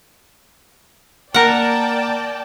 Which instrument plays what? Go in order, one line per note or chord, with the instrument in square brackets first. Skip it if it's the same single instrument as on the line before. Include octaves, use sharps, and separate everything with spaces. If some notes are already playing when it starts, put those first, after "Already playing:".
[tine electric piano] A#3 A#5 [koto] A#4 F#5 [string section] D5 G5 A5